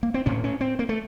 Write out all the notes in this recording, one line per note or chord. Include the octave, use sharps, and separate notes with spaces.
A#3
C4
A2 C#4
C#4
C4
A#3
A3